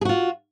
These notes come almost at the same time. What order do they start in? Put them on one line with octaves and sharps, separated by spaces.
G#4 F#4 F4